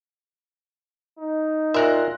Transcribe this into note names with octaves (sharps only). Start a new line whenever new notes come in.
D#4
A#2 F#4 A#4 E5 C6 F#6 A#6